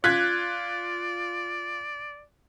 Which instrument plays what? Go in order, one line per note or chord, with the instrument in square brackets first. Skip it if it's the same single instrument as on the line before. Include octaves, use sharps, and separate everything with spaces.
[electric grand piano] F4 B6 [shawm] D5 [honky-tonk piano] F#6 G#6